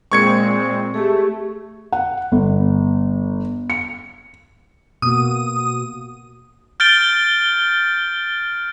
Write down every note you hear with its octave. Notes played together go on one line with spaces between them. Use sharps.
A#2 G#3 C4 C#6 G#6 C#7
A3 G4 G#4
F#5
G1
C#7
B2 A#3 F#4 D#6
F6 G6 A6 D7 G7